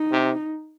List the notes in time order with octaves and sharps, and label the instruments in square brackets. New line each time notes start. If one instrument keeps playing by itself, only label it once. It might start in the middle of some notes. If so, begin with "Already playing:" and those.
Already playing: [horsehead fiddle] D#4
[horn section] C3